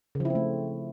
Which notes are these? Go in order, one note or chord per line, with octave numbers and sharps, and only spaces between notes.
C#3
F3
E4
C4
A3